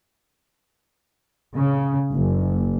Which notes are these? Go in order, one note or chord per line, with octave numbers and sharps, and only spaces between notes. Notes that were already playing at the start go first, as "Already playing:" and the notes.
C#3
F#1